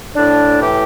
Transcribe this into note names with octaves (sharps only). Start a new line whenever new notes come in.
A2 D4
E3 G4